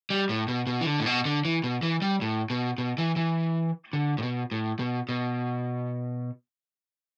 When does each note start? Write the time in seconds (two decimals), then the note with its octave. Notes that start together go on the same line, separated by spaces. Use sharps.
0.10 G3
0.29 A2
0.48 B2
0.67 B2
0.81 E3
0.86 D3
1.00 A2
1.06 B2
1.25 D3
1.45 E3
1.64 B2
1.82 E3
2.02 G3
2.21 A2
2.50 B2
2.78 B2
2.98 E3
3.16 E3
3.93 D3
4.18 A2
4.23 B2
4.52 A2
4.79 B2
5.09 B2